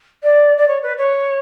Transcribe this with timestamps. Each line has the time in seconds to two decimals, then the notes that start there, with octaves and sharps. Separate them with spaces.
0.23 D5
0.57 D5
0.68 C#5
0.82 B4
0.97 C#5